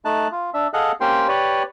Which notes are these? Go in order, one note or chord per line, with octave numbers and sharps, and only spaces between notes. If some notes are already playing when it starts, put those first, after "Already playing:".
A3 D#4 A5 F#6
F4
D4 E5
G#4 A4 D#5 F5 F#5 F#6
A#3 C#4 G4 C5 G5 C6
G4 B4 C#5 D5